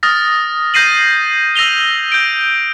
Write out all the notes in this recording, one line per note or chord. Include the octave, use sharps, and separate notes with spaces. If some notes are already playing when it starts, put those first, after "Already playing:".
D#6 F6 A6 A#6
G6 A#6 C7 D#7 F#7
E6 A#6 D#7 F7 G7
G6 D7